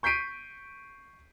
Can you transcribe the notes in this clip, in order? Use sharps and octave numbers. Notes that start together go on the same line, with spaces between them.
C#6 G6 B6 C7 D7 D#7